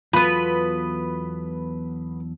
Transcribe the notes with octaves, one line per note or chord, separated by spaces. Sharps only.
E2 F#3 B3 F4 A4 B4